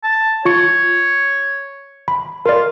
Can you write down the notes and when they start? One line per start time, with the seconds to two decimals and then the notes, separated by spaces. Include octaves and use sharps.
0.03 A5
0.45 F4 C#5 C#6 C#7
2.08 B5
2.46 F4 A#4 D5